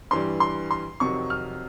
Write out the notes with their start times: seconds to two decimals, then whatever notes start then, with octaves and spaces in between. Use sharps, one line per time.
0.11 G2 E3 G3 C6
0.40 C6
0.71 C6
1.00 F2 C3 D#3 F#3 C#6
1.30 F6